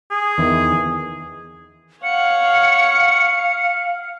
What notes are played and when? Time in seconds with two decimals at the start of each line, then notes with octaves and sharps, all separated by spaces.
0.11 G#4
0.38 E2 D#3 E3
2.04 C#5 F5 F#5 C#7